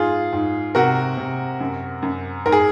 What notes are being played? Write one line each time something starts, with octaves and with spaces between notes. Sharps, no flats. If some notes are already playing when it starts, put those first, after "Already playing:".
Already playing: G#2 F4 G#4
G#2
C3 F#4 A#4
C3
F#2
F#2
G#2 A#4
G#4